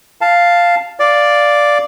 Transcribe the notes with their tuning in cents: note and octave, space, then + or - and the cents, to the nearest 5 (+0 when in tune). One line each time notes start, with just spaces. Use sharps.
F5 +0 A5 +0
D5 +0 F5 +0